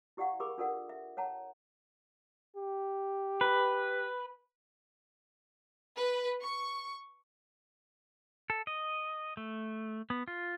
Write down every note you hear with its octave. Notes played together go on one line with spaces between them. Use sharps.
E4 G4 D5 F5 F#5 C#6
G4 G#4 A#4 B5 D6
D4 F4 A4 A#4 D5 F#5
E5
C#5 F#5 A5 A#5
G4
B4
B4
C#6
A4
D#5
A3
B3
F4